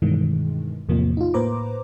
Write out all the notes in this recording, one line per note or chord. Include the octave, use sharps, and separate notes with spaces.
G2 B2 D#3 E3 G#3
E2 A2 C3 F3 A#3
D#4 F4
A2 A#3 B4 C5 A#5 D6